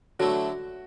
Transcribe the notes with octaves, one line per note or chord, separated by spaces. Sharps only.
D3 F#3 A3 E4 F#4